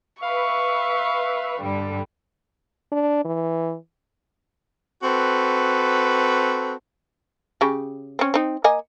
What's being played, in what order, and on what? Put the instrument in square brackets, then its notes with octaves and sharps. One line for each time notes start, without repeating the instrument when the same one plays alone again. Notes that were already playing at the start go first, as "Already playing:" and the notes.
[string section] B4 E5 [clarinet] F5 [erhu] C#6
[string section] G2 D3 G3
[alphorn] D4
E3
[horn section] C4 F#4 A4 B4
[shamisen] C#3 G4
C4 C#4
C4 D#4
A#3 D#5 G#5